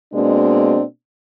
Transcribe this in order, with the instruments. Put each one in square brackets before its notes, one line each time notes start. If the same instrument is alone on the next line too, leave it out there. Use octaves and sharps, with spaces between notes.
[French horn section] B2 G#3 A#3 C4 D4